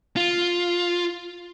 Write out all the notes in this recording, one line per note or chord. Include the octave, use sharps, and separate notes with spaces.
F4